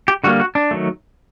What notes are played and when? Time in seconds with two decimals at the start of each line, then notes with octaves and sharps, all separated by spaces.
0.08 G4
0.24 D3 G3 A#3 F#4
0.40 F#4
0.55 D4
0.71 D#3 F#3 A3